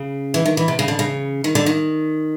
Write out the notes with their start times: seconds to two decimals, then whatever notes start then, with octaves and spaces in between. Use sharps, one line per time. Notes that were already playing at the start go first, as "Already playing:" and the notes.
Already playing: C#3
0.34 E3
0.46 D#3
0.57 E3
0.68 C3
0.79 C#3
0.88 D3
0.99 C#3
1.44 D#3
1.55 D3
1.66 D#3